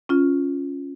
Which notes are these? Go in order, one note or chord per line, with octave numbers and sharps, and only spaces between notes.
C#4 F4